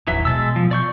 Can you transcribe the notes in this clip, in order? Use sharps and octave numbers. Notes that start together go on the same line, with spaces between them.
D#1 A1 E3 F#3 E5
B2 G#3 A5 E6
F3
D5 C#6 G6